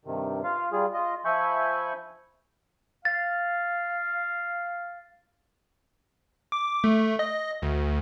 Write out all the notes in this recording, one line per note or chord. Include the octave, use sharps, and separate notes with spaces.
G2 C3 D#3
F4 F5
G3 F4 G#4
F4 D#5
F3 E5 G#5 B5 C#6 G6
F5 A6
D6
A3
D#5
D2